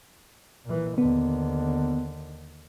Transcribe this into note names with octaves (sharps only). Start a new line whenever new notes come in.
A#2 E3
D#2 D3 B3